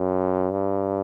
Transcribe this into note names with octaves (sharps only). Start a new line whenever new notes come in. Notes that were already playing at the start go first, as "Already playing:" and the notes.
Already playing: F#2
G2